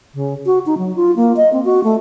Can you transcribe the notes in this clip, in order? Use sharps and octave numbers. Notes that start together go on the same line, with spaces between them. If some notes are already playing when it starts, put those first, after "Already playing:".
C#3
F#4
D#4
F#3
F4
A#3
D#5
C4
F#4
A3